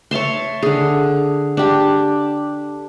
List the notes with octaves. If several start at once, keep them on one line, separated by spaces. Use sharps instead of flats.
C#5 E5 A5 C6
D3 G#4
D4 G4